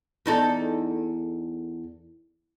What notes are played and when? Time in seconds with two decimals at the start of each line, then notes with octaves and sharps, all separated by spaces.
0.26 E2 D#4 A4